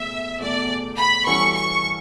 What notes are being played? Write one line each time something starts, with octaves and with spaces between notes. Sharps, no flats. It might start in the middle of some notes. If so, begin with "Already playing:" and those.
Already playing: E2 B2 A3 E5
E2 B2 A3 D5
B5
E3 G3 C#4 F#4 A4 C#6
C#6